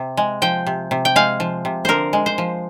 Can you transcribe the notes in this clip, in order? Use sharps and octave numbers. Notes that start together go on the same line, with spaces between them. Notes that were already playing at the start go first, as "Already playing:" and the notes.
Already playing: C3
G#3
F3 G5
C3
C3
G5
G#3 F5
F3
C3
D3 A#4 C5
G#3
C5
F3